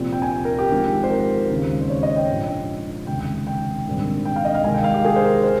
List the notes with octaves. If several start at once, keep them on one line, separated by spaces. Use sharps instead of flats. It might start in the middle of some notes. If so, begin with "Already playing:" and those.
Already playing: C2 A#2 F3 C4
G5
G#5
G5
A#4
G4
G#1 G#2 F3
C5
A#4
D#2 C#3 G#3 C4
C5
C#5
D#5
G5
A#1 G#2 F3
F1 D#2 C#3 G#3 C4 G5
G5
G5
A#1 G#2 D#3 G3 C4
G5
F5
D#5
F5
C2 C3 D#3 G#3 G#5
G5
F5
G4
G#4
C5
A#4
C5